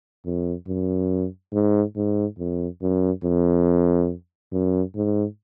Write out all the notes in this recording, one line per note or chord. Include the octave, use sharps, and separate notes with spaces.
F2
F#2
G#2
G#2
F2
F#2
F2
F#2
G#2